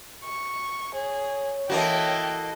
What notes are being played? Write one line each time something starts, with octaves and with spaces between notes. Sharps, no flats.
C#6
G#4 C#5
E3 A#3 F#4 A4 D#5 G5